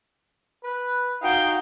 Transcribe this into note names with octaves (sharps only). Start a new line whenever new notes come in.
B4
D#4 F#4 F5 G5